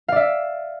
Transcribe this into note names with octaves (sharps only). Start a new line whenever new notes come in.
D5 E5 F5